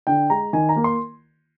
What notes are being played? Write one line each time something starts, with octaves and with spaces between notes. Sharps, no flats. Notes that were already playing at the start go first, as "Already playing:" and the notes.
D3 G5
G#3 A#5
D#3 G#5
A#5
A#3
C6